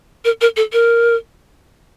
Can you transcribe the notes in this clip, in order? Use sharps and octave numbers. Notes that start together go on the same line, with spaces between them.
A#4
A#4
A4
A#4